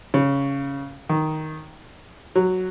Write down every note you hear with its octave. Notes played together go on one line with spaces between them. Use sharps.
C#3
D#3
F#3